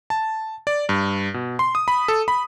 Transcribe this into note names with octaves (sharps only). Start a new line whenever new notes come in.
A5
D5
G2
B2
C6
D#6
B5
A4
B5